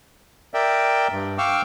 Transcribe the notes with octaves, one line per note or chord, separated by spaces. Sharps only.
A#4 D5 E5 G5
G2
F5 G5 C#6 D6 E6 F6